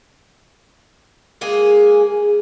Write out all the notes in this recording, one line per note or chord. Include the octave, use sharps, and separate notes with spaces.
G#3 A#3 G#4 G#5